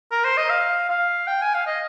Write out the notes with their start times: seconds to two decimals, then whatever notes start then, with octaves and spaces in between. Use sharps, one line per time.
0.11 A#4
0.25 C5
0.37 D#5
0.50 F5
0.89 F5
1.27 G5
1.41 G#5
1.54 F5
1.66 D#5